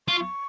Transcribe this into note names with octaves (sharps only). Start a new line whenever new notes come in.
F4 C#6